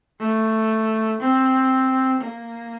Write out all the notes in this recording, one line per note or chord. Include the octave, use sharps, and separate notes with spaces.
A3
C4
A#3